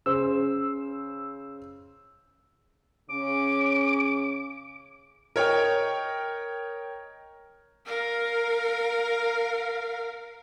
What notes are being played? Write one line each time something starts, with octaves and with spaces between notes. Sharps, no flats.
C#3 C5 E6
C#3 C#4 D6
A#4 C#5 D#5 G5
A#4 F5